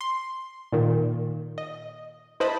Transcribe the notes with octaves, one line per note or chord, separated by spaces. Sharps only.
C6
A#2 D#3
D#5
E4 B4 C5 D#5 A5 B5